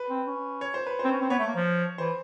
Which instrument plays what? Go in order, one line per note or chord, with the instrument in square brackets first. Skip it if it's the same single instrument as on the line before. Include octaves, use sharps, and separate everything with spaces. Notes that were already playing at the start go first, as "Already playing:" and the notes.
Already playing: [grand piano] B4
[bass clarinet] C4
C#4
[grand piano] C#5
C5
B4
C5
[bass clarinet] C4
C#4
C4
[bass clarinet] B3 [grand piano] C#5
[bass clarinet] A3
A#3
F3
[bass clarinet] E3 [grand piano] C5